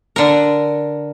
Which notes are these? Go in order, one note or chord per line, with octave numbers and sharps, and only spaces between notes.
D3 A#4